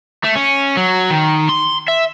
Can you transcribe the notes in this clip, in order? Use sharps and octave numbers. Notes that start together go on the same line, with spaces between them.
A3
C#4
F#3
D#3
C6
E5